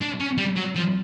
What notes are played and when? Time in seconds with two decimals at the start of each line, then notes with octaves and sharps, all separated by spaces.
0.01 D4
0.20 C#4
0.38 G3
0.56 F#3
0.76 F3